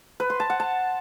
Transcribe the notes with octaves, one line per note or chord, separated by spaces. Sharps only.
B4
C6
A5
F#5
A5